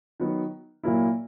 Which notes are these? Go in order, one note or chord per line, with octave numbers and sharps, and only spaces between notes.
D#3 F#3 B3
A#2 F#3 A#3 E4